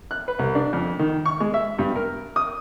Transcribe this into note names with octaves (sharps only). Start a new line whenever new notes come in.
F#6
B4
C2
D4
F2
D#3
C#6
G#3
E5
G2
A#4
D#6